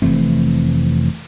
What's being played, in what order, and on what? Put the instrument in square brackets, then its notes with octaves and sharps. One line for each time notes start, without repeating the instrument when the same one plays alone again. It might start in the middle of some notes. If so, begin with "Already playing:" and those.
[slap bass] F1 E3 A3 C4